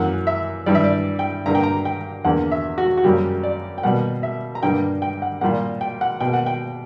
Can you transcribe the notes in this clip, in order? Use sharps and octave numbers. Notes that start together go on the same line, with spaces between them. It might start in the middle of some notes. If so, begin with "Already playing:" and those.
Already playing: F#2 E3 A#3 F#5
E5
G2 E3 G3 D5
E5
D5
G5
G2 D3 A#3 A#5
G5
A#5
G5
E2 D3 A#3 F#5
E5
F#4
F#4
F#2 C#3 G3 A#3 G4
D5
G5
B2 G3 A#3 F#5
E5
A#5
G2 D3 G3 A#3 G5
G5
F#5
A#2 G3 A#3 F#5
G5
F#5
B2 A#3 G5
F#5
G5